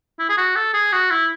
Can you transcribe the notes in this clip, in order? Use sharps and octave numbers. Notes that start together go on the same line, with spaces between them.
E4
G#4
F#4
A4
G#4
F#4
E4